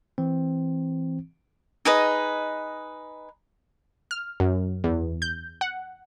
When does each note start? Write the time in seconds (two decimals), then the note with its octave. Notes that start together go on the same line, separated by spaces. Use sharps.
0.18 E3 C4
1.85 D#4 G#4 B4 D#5
4.11 F6
4.40 F#2
4.84 E2
5.22 G6
5.61 F#5